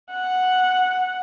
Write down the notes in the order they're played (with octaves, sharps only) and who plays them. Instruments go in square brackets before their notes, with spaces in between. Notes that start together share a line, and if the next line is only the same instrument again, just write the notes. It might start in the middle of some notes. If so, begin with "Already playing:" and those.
[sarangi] F#5